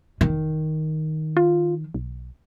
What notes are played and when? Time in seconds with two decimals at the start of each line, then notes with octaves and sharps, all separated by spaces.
0.21 F1 D#3
1.37 F4
1.94 B1